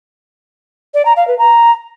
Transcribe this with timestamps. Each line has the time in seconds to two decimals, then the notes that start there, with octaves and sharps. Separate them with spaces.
0.94 D5
1.05 A#5
1.16 F5
1.28 B4
1.39 A#5